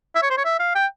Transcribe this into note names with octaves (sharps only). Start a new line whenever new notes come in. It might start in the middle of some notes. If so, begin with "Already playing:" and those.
E5
C#5
C5
C#5
E5
F5
G5